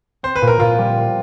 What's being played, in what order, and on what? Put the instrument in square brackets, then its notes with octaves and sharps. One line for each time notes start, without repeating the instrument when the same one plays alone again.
[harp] C4 [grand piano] C5
[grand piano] B4
[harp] A#2
[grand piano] A#4
[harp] A#2 [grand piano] F4
[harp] G3
C4